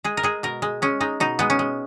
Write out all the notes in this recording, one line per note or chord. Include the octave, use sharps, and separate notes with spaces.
G#3 G#4
A#4
G#3 G#4
B2 A#4
G#3
G#3 C#4
G#3 D#4
B2 D#4
G#3 B3
C#4
G#3